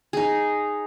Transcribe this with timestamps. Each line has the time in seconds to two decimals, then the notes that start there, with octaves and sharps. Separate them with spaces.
0.13 D#4 G#4